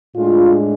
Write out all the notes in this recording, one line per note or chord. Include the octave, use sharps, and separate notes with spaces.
A2 G#3 D4 F4